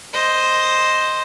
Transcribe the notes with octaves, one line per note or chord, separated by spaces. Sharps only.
C5 D#5